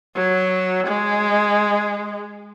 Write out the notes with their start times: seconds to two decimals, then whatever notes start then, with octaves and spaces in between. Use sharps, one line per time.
0.16 F#3
0.87 G#3